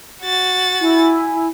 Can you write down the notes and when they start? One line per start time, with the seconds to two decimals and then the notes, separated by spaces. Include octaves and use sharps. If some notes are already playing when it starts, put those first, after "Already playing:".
0.22 F#4 A6
0.79 E4 G#5